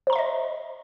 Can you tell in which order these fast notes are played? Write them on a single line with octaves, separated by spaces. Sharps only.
C5 A#5 C6 E5 D#5